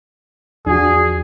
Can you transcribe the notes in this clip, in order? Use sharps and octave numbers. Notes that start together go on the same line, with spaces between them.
E2 F3 D4 F#4 G#4